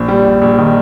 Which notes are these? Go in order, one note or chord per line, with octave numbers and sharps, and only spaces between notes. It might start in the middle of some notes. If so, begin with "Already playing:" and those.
Already playing: A#1
G3
A#1
A#1
D#3